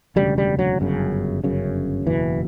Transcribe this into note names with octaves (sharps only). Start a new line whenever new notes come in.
E1 D2 C#3 G3
G3
F#3
G1 F#2 C#3
G1 F#2 C#3
F#1 E2 B2 E3